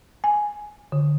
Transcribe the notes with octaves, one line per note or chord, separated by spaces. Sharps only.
G#5
D3